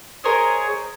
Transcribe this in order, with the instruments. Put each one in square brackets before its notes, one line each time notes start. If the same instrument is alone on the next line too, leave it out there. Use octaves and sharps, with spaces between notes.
[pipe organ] G#4 C#5 [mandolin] A#4 C5 D#5